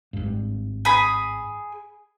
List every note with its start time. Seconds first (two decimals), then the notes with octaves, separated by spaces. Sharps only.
0.13 G#1 G2
0.85 G#4 B5